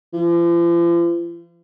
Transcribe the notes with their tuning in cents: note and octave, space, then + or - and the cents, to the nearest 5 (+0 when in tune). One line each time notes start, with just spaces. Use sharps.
F3 -45